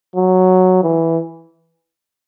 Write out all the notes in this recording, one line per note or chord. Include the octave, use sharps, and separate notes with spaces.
F#3
E3